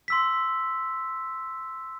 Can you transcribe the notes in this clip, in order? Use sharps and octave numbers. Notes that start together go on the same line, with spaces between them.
C6 E6 B6